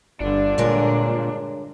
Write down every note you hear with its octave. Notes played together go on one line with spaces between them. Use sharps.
G1 G2 D3 D4
A#2 G#3 A#4 C#5